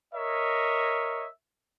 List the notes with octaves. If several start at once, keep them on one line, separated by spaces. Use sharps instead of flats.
A#4 C#5 D#5 E5